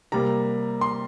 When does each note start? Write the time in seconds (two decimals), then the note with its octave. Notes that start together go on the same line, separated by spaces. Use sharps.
0.12 C3 G3 A#3 A#5
0.81 C6